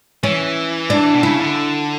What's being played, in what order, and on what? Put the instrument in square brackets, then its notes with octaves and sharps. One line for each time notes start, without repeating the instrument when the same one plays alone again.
[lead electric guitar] E3 [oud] C#4
[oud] D4
[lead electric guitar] B2
[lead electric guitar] C#3 [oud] E4
[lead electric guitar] D3